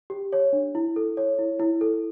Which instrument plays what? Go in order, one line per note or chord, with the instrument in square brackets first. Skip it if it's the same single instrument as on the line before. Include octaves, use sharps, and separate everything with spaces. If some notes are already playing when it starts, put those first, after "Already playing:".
[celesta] G4
C#5
D4
E4
A4
C#5
E4
E4
A4